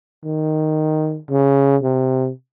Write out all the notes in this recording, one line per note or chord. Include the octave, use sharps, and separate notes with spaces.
D#3
C#3
C3